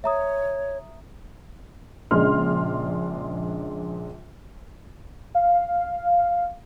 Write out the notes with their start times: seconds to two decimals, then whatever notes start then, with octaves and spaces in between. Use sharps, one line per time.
0.04 C#5 E5 A#5 D#6
2.11 A#1 C#3 G#3 D4 C6 F6
5.35 F5